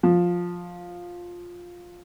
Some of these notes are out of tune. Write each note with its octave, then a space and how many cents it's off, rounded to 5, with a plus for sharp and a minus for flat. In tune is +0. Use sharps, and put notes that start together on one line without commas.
F3 +10